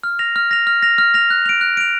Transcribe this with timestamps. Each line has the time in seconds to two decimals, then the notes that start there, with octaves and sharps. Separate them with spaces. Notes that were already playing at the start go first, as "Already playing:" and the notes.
0.03 F6
0.19 A#6 F7
0.36 F6
0.51 A#6 F7
0.67 F6
0.83 A#6 F7
0.98 F6
1.14 A#6 F7
1.30 F#6
1.46 D7 F7
1.61 F#6
1.77 D7 F7